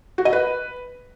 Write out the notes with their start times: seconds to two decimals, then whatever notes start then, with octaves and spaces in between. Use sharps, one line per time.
0.18 F#4
0.25 D#5
0.33 B4